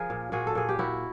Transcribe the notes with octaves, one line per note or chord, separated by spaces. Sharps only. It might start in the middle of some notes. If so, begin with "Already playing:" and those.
Already playing: F3 G#4 A#4
A#2
A#2 F#4 G#4
A4
A#2 G#4
G4
A#2 E4 F#4